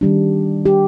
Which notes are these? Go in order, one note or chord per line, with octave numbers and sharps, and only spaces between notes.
D#3 G3 D4
G4